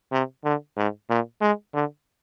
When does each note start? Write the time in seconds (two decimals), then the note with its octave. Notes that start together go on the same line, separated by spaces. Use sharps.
0.12 C3
0.44 D3
0.77 G#2
1.09 A#2
1.41 G#3
1.74 D3